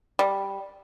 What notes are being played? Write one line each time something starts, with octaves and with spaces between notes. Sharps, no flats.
G3